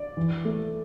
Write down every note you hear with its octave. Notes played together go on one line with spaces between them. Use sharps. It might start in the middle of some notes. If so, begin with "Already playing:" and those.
Already playing: D5
E3
A3